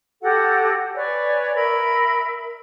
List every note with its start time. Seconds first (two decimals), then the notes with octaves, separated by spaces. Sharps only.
0.21 F#4 G4 A4 F#5
0.94 B4 C#5 D5 G#5
1.54 A#4 E5 B5